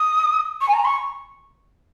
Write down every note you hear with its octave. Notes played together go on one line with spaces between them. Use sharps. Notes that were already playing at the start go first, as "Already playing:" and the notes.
Already playing: D#6
C#6
G#5
A#5
C#6